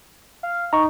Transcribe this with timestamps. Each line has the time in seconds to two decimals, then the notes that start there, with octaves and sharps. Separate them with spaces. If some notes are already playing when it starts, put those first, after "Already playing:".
0.43 F5
0.73 D#4 A#5 C#6